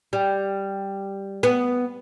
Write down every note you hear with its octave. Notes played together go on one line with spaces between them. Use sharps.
G3
B3